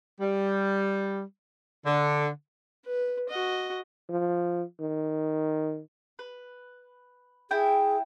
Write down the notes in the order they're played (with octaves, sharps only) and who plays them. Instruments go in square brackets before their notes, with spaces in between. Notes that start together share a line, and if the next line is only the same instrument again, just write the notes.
[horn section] G3
D3
[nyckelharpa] B4
F#4 D#5
[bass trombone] F3
D#3
[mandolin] B4
[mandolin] E4 G5 [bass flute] G#4